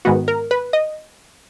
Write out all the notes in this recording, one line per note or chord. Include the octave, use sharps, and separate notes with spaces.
G#2 D#3 G#3 B3 F#4
A#4
B4
D#5